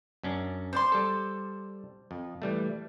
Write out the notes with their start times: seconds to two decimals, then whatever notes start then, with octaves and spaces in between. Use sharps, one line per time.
0.23 F#2 C#4 D4
0.73 C5 D5 C6
0.92 G3 A4
2.11 F2
2.42 E3 G3 A3